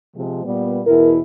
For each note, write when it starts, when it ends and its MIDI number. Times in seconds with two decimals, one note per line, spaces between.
0.15 0.40 48
0.15 0.40 53
0.15 0.40 56
0.45 0.80 46
0.45 0.80 55
0.45 0.80 59
0.86 1.19 40
0.86 1.19 47
0.86 1.19 64
0.86 1.10 70